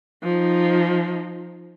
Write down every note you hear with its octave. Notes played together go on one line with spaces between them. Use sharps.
F3 D#4